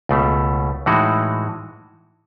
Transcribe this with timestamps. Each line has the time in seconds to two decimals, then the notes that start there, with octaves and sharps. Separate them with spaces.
0.09 C#2 B2 A3
0.86 A2 E3 G#3 D#4 F#4